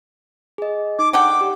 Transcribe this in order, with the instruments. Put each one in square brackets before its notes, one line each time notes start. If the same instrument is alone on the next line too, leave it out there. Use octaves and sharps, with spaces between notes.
[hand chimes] G#4 D#5
[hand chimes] D#4 [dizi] D6
[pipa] D3 F#5 G5 [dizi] D6
[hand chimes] G4